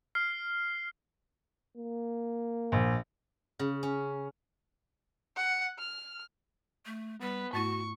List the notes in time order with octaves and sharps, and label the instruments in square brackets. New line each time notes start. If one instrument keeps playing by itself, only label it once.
[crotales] F6 C7
[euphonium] A#3
[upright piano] A#1
[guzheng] C#3
C#4
[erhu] F#5
F6
[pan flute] A3
[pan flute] G3 [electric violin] B3 B4
[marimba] G#2 A3 E4 [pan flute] F#4 [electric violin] C#6